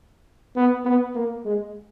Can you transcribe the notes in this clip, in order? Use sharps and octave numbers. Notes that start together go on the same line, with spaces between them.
B3
B3
A#3
G#3